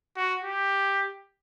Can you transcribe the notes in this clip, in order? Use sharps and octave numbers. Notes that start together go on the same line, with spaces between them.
F#4
G4